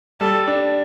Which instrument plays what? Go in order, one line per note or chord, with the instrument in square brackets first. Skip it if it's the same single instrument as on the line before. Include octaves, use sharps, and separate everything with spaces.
[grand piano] G3 [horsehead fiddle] A4
[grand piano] D4